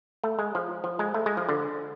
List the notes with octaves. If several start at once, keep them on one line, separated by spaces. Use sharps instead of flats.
A3
G#3
F3
F3
G#3
A3
G#3
F3
D3